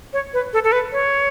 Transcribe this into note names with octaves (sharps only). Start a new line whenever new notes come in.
C#5
B4
A4
A4
B4
C#5